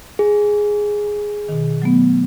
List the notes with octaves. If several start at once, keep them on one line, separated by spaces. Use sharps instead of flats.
G#4
B2 D#3
F#3 A3 B3